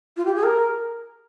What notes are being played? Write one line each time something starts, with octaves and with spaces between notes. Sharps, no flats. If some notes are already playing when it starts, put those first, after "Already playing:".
F4
G4
G#4
A#4